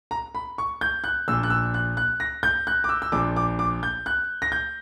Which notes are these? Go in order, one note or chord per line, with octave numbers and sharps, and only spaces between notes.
A#5
B5
C#6
G6
F#6
A#1 A#2 E6
F#6
E6
F#6
F#6
A#6
G6
F#6
D6
E6
E6
A#1 A#2 D6
D6
D6
G6
F#6
A#6
G6